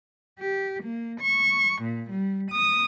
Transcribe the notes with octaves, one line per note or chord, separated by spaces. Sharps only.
G4
A#3
C#6
A#2
G3
D#6